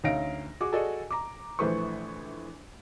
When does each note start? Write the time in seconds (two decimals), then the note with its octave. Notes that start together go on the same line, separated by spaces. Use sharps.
0.04 D2 C#4 D#4 F5 A#6 D7
0.60 F#4 G#4 D6
0.73 F#4 G#4 A4 D5 D#5 G#5
1.11 A#5 D6
1.59 A#1 E3 A3 B4 C5 C#6